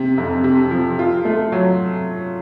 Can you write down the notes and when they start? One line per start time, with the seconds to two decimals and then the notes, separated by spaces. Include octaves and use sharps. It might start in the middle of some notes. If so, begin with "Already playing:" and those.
Already playing: C3
0.18 F2
0.44 C3
0.71 F3
0.99 F4
1.25 A3
1.52 F#3